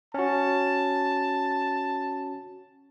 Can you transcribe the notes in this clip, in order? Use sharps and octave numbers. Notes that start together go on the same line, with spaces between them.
C#4 F#4 A5